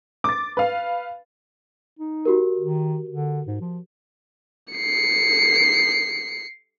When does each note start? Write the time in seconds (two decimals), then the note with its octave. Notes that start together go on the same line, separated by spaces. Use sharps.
0.24 D6 A6
0.57 B4 F5
1.99 D#4
2.25 F#4 G4 A#4
2.59 D#3
3.09 D3
3.47 G#2
3.61 F3
4.73 C7 C#7